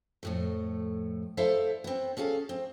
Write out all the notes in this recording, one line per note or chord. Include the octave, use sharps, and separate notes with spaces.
F2 A2 A3
E4 A4 C5 D5 E5 F5
B3 C4
C#4 G#4 A4 F5
C4